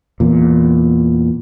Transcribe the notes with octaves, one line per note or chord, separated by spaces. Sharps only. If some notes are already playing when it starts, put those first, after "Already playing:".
E2 A#2